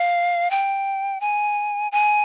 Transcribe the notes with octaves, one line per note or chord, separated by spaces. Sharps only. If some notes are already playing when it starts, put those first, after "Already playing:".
Already playing: F5
G5
G#5
G#5